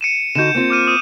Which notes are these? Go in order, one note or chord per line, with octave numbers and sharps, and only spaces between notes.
C#7 D#7 E7
D3 D#4 F#4 G6 E7
A#3 C4 F4
D6 F6 D#7
D#6 D#7